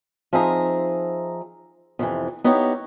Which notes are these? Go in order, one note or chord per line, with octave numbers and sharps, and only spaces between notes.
F3 C4 D#4 G#4 E5 A#5
F2 C3 E3
B3 D#4 E4 G4 C#5